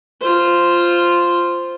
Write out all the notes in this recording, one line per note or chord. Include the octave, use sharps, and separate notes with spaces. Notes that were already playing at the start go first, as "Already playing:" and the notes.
F4 C5